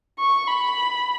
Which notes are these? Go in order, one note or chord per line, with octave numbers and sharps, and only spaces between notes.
C#6
B5